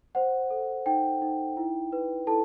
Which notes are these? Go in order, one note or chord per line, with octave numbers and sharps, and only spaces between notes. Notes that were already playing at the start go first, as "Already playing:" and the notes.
C5 F#5
A4
D#4 G5
D#4
E4
B4
E4 A4 A5